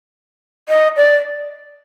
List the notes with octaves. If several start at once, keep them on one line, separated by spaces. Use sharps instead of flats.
D#5
D5